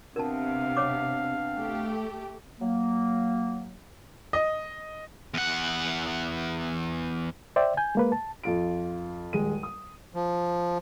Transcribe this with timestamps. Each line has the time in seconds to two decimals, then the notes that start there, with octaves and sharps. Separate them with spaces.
0.16 C3 B3 C4 D4 A#4 F5 A5
0.77 C#5 D6
1.55 A3 G4
2.60 F#3 A#3
4.33 D#5
5.34 E2 F#5
7.56 C5 D5 E5 G5
7.77 G#5 G6
7.95 G#3 A#3 B4
8.12 A5
8.43 F2 F4 D7
9.33 D#1 G#3 D#7
9.63 D#6
10.15 F3